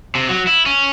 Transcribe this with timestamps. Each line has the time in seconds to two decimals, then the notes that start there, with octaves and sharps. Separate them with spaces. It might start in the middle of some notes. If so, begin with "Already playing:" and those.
0.15 C3
0.29 F#3
0.47 E4
0.66 C#4